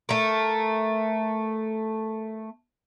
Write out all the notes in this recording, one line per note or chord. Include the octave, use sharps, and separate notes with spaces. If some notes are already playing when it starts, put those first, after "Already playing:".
A3 A#4